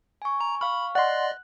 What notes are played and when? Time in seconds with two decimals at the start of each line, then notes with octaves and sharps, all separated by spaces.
0.22 G#5 C#6
0.41 A#5
0.61 F5 B5 C#6 F6
0.95 D5 D#5 F#5 C6 F#6